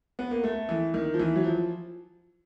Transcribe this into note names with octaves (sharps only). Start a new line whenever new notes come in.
B3
A#3
A3
E3
D#3
F3
E3
F#3
F3